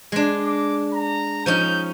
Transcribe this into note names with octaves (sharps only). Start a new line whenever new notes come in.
G#3 D4
D6
A#5
F3 C#4 D#4 G6